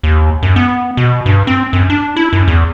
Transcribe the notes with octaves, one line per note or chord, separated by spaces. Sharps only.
D#2
F#2
B3
B2
G2
C4
F#2
D4
E4
F#2
E2